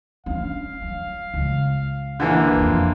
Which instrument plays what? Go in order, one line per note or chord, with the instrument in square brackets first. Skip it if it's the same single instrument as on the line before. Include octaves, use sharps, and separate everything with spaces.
[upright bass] C#4 D4 [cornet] F5
[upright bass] F#3
C#2
[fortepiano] D3 E3 A#3
[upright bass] B1 F2 [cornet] F4